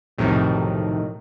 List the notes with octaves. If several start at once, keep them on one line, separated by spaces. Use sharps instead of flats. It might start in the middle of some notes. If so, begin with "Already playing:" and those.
B1 F2 A2 C3 D#3